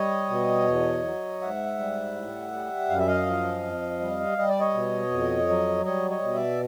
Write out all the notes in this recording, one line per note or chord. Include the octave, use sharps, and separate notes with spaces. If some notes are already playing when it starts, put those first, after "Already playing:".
Already playing: G3 C#5 D#5
B2
E2
F#3
G#2 E5 F#5
G3
A2
G3
F#2 F5
E5
D#5 F5
F3
F2
G3
G3 D#5
D5
C#5 D#5
B2
F2
F#3
G3 C#5 D#5
C#5 D#5
B2
D5 E5